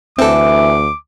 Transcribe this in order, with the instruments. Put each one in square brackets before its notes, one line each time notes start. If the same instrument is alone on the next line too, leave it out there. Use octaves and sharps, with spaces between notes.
[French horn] D2 [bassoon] E3 [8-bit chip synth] C4 A4 [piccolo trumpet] D6